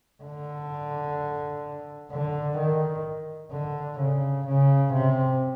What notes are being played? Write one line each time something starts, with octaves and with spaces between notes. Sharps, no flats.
D3
D3
D#3
D3
C#3
C#3
C3